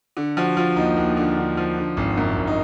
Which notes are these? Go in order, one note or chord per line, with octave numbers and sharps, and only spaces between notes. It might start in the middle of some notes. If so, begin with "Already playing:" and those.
D3
F3 F#4
F3 F4
D#2 D#4
D#2
D3
D3
F3
D3
G#1
F#2
G#1
D#4